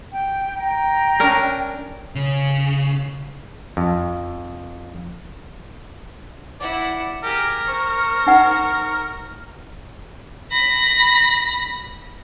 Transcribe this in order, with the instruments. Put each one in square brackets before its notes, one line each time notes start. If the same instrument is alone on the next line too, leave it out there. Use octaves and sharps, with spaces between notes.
[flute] G5
[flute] G5 [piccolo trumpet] A#5
[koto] C#4 D4 A#4
[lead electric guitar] C#3
[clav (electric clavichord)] F2
[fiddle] E4 F#5 [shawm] D5
[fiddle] G4 G#4 [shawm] A#4
[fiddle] C5 C#6
[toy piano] D#4 F#5
[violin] B5 A#6